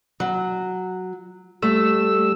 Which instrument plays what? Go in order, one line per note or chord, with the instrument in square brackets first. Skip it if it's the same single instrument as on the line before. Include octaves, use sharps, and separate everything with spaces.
[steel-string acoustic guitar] F#3
[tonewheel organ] G3 E6 [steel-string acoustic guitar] A3